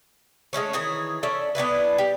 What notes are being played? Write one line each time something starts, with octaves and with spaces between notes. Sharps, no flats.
G#3 A3 C#4 C#5
D#3 E3 G#4 C#5
C#4 A4 D5 E5
B3 D4 E4 B4
G4